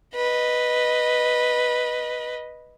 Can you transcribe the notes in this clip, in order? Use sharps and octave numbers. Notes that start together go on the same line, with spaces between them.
B4 D#5